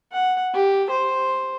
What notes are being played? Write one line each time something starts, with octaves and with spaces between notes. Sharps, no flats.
F#5
G4
C5